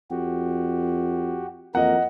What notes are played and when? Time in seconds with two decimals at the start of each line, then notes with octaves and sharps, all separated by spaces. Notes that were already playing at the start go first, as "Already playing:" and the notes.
0.11 F2 F#4 G4
1.75 F2 E3 A#3 A#4 D#5 F#5